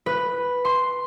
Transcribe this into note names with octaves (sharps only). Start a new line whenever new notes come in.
B4
C6